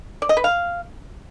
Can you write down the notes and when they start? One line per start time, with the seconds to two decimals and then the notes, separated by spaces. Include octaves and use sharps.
0.22 D5
0.29 D#5
0.37 B4
0.44 F5